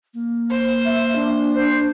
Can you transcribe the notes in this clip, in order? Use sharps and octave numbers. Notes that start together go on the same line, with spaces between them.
A#3
C5
E5
D4
C5